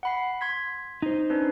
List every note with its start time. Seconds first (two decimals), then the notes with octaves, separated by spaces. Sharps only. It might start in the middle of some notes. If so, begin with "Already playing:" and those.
0.03 F#5 B5 C7
0.41 C6 G#6 B6
1.02 D#4 C5
1.30 C#4 D4 B4